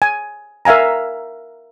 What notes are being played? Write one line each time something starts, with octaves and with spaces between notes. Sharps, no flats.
G#5
A#4 E5 F5 G#5 A#5